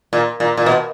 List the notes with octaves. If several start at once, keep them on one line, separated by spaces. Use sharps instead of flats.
A#2
A#2
A#2
B2